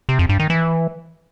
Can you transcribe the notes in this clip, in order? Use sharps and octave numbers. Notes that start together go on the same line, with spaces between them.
C3
F2
G2
D#3
E3